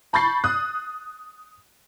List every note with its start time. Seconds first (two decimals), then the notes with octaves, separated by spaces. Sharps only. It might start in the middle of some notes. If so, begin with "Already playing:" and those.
0.13 A5 B5 C#6 G6 A6 C7
0.44 D#6 F#6